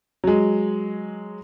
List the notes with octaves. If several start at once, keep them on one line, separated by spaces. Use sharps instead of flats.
F#3 G#3